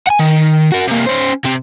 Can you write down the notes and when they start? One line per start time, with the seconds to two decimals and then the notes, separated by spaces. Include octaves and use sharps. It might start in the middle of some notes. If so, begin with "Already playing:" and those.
0.07 F#5 G#5
0.19 D#3
0.72 F#4 A#4
0.87 C3 A#3
1.06 C#4 C5
1.45 C3 C4